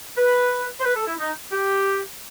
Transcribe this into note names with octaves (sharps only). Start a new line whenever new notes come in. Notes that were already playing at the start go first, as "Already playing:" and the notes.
B4
C5
B4
A4
E4
D#4
G4